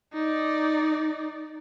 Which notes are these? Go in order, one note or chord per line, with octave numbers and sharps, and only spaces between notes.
D#4 D5